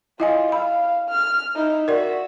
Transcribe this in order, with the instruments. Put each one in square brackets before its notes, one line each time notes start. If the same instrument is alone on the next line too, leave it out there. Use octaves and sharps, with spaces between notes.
[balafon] E4 D#5 G#5 [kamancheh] F4
[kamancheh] F5 [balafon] B5
[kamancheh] F6
D#4 E4
[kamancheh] F#4 E5 [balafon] A#4 D5